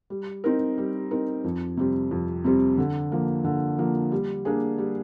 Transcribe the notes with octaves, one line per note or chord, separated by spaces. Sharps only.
G3
C4 D#4 A#4
G3
C4 D#4 A#4
F2
C3 G3 C4
F2
C3 G3 C4
D3
F3 A#3
D3
F3 A#3
G3
A#3 D4 G#4
G3